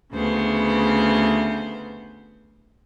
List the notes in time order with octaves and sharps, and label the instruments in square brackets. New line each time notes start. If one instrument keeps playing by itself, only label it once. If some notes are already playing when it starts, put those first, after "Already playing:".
[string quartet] D2 C#3 B3 C5